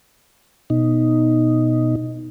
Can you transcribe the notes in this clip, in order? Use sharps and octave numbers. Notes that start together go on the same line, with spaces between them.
B2 D#4